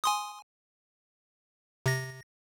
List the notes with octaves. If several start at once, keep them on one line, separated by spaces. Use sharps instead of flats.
G#5 C6 D#6
C3 A#6